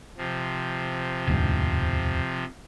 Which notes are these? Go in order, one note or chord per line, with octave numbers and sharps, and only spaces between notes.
C3 F3
E1 D2 G#2